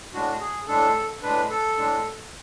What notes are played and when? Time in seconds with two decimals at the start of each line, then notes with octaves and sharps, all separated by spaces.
0.13 A2 G#3 D4 F#4
0.41 G#4
0.68 A2 G#3 D4 A4
1.23 A2 G#3 D4 B4
1.50 A4
1.78 A2 G#3 D4